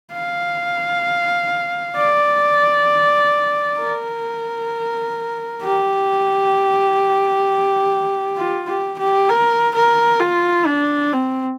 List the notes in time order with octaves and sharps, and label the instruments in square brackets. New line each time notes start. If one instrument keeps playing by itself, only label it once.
[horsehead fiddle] F5
D5
A#4
G4
F4
G4
G4
A#4
A#4
F4
D4
C4